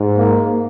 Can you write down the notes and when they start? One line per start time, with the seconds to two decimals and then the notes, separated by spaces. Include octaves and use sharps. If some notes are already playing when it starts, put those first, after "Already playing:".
Already playing: G#2
0.18 A#3